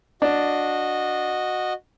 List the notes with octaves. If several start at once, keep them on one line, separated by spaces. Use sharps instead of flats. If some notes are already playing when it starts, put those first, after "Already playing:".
D4 F#4 D#5